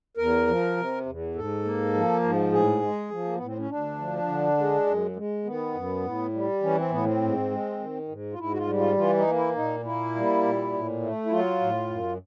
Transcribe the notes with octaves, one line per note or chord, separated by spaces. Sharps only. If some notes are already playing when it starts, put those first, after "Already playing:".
E2 A#4
F3
C3
E2
G#2 A4
A#3
F3
G#2
A2 G#4
G#3
F3
A#3
A2 B3
C4
C#4
D2 D4
F3
D3
G#3
F#2
G#3
D#3 B3
F#2
A2
G3
E3 C#4
C4
A2 B3
C4
G#2
G#3
D#3
G#2
F4
G#2 E4
F#4
F4
G3
F4
E3 F4
D#4
A#3
E4
A#2 D#4
A#3 E4
G3
A#2
A2
A3
E4
F#3 F4
A2
F#2